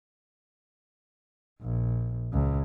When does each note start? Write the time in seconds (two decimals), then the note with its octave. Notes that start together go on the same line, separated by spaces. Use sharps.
1.62 A#1
2.33 C#2